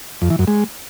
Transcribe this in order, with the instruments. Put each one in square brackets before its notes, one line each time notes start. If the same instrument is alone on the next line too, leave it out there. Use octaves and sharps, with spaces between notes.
[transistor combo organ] F2
E3
F#2
G#3